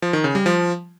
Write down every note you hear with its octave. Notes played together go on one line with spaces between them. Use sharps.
F3
D#3
C#3
G3
F3